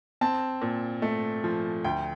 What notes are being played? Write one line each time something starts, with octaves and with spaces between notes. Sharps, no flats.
C4 A5
A#2
A3
F3
D2 G5